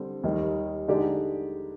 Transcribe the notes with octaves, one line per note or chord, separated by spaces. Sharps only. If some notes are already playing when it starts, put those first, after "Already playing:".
Already playing: D3 G3 C4
D#2 D#3 G3
D3 G#3 D#4 G4 D5